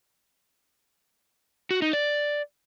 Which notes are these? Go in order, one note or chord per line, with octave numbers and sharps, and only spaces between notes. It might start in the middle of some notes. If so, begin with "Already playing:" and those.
F#4
D#4
D5